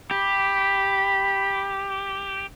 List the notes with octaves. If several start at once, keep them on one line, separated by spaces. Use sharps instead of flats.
G4 B5